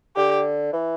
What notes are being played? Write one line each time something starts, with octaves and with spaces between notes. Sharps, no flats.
D3 G4
E3